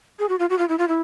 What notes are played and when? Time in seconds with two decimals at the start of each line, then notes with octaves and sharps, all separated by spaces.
0.19 G#4
0.29 F#4
0.39 F4
0.50 F#4
0.58 F4
0.69 E4
0.78 F4
0.88 E4